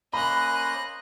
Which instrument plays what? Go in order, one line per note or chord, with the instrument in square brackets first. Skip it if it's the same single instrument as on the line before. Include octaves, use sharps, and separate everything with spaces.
[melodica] A#3 C#4 C5 [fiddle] D#5 F#6 [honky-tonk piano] B5